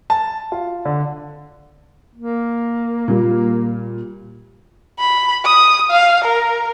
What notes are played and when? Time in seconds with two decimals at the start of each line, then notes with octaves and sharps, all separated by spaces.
0.10 A5
0.52 F4
0.85 D3
2.15 A#3
3.08 A#2 G3
4.99 B5
5.45 D#6
5.91 F5
6.25 A#4